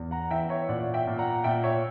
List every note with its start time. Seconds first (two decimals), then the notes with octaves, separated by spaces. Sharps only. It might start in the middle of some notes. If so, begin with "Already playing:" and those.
Already playing: E2
0.11 F#5 A#5
0.31 E3 E5 G5
0.49 C#5 E5
0.68 A#2 D5 F#5
0.94 E5 G5
1.07 A#2
1.19 F#5 A#5
1.44 A#2 E5 G5
1.63 C#5 E5